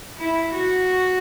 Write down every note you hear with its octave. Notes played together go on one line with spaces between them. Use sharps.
E4
F#4